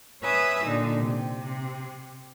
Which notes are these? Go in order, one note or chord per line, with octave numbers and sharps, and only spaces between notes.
B4 C#5 E5 G#5 D#6 E6
A#2 D3 D#4
C3